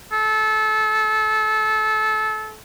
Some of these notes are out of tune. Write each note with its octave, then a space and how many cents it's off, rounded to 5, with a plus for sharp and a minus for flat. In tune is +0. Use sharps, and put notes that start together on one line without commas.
A4 -25